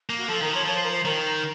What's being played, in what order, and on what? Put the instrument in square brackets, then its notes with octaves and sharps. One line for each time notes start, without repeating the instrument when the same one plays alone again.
[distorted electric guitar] A#3
[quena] F#4
[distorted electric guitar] F3 [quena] A4
[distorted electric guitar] D#3 [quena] A#4
[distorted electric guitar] F3 [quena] C#5
[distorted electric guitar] F3 [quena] C#5
[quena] C5
A#4
C5
[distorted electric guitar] D#3 [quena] A#4